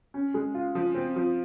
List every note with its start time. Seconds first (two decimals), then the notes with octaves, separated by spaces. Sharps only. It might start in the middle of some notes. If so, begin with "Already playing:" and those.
0.14 C#4
0.34 G#3
0.54 F4
0.75 F3
0.95 C4
1.16 F3